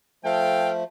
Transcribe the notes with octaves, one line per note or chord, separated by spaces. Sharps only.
F3 A3 A4 F5 G5